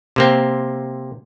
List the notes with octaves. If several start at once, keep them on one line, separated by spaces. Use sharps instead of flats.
C3 A#3 C4